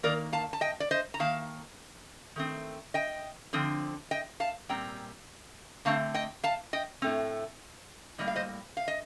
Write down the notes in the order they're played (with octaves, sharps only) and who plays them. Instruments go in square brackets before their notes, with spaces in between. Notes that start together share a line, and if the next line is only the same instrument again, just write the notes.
[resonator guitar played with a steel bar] D#3 A#3 A#4 D5
F5 A5
A5
D#5 G5
D5
C5 D#5
A#5
D#3 A#3 F5 A5
D#3 A3 C4
D#5 G5
D3 F3 C4
D#5 G5
F5 A5
A#2 G3 C4 G5 A#5
D3 A3 C4 F5 A5
D#5 G5
F5 A5
D#5 G5
A2 A3 C4
A2 G3 A#3 D#5
F5
C5 D#5
F5
D#5